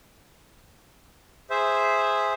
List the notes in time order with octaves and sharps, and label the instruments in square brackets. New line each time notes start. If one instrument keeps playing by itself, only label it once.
[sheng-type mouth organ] G#4 C5 E5